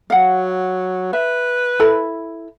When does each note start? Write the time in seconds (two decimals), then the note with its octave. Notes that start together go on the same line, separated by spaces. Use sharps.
0.10 F#3 F5 F#5
1.13 B4 E5
1.80 E4 A4 B5